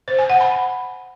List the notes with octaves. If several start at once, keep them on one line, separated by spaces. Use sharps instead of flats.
C5
G#5
F#5
B5